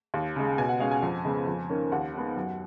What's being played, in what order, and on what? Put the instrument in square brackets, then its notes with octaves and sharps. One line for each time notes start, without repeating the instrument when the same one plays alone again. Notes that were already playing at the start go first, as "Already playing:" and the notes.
[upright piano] D#2
C#3 G#3
B2 G#5
F#5
G#3 C#4 F5
G#5
F2
C#3 G#3 B3
F2
D#3 A#3 C#4
D#2 F#5
D#3 G#3 B3
F#2